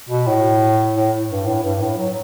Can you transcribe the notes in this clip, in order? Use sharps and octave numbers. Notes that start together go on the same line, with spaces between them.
B2
A2
A2
G2
A2
G2
A2
F#3